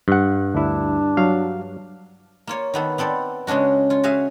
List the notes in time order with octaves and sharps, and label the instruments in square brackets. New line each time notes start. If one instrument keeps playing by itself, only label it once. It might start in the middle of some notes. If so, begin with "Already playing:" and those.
[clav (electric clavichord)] G2 F#5
[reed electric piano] D2 E4 [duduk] D4
[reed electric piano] F#3 F5
[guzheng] A#3 F4 C#5
D#3 B3 A4
B3 C4 A4 D5
C#3 G#3 C#4 D4 F#4
F4 C#5
F#4 G#4 E5 F5